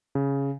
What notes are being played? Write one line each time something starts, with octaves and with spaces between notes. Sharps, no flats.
C#3